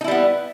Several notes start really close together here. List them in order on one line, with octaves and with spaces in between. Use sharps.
D#4 E4 G3 B3